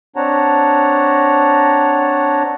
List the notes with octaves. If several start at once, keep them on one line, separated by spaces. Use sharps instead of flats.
C4 D4 C#5 F#5 A5 A#5